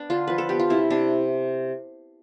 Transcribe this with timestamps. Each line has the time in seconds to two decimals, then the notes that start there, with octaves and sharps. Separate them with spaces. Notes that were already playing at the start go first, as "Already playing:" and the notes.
Already playing: B3 D4
0.10 D3 F4
0.28 F3 B4
0.38 A4
0.49 B3 G4
0.60 F4
0.70 C3 E4
0.90 C3 D4